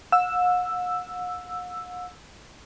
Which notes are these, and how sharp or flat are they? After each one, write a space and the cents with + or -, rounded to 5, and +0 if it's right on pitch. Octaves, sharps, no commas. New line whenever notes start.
F#5 -45 E6 +5